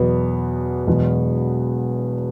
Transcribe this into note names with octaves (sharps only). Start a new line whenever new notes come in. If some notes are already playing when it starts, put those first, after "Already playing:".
Already playing: E2 B2 F#3 B3
E1 E2 B2 F#3